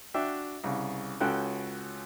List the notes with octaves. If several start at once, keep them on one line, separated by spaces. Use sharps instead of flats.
D4 F#4 E5 G5
C2 C#3
C#2 C#4 F#4 A4 G5 F#6